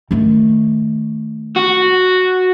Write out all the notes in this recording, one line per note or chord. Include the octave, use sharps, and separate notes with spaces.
D#3 A3
F#4